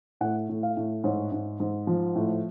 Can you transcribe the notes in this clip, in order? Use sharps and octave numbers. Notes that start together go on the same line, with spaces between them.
A2 F#5
A2
F5
A2
G#2 C#5
G#2
G#2
F3
A2